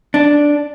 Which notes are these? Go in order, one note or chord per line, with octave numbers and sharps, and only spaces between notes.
D4